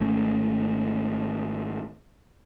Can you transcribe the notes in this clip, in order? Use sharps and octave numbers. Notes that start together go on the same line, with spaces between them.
G#1 A3 C#4